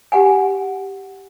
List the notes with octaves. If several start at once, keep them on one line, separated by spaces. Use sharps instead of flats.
G4 F#5 G#5